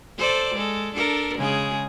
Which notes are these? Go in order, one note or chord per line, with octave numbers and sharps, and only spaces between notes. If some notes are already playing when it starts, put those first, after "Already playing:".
A4 C5 D5
G#3 A4
D4 A4 A#4
C#3 G#3 G#4